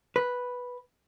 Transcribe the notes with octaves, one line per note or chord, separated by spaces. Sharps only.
B4